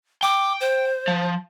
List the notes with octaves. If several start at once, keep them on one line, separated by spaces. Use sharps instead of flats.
G5 D6
C5
F3